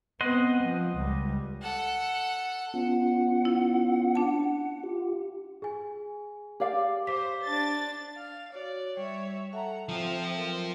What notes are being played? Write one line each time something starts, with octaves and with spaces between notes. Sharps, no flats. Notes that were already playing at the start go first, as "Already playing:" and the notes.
B3 C4 D#5 F#5 C6
F3
C#2 G3
A4 F#5
B3 C#4 F4 F#5
E4
D4 A5
F4 G4
G#4 G#5
G4 D5 F5
C5 D6 B6
D4 A6
F5
F#4 C#5 D5
G3 C#5 E5
A4 E5 F#5 A5 A#5
F3 C4 F4
F#3 A#4